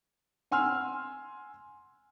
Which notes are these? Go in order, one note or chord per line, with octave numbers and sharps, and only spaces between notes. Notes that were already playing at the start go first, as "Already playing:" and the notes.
F#5 G#5 C6 E6 F6